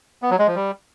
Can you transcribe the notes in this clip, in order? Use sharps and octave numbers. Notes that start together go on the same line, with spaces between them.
B3
F#3
G#3
F3
G3